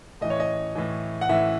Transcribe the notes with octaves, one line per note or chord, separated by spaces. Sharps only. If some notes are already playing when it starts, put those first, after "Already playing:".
A2 E3 D#5
C#5
D#5
A2 E3
F#5
A2 E3 E5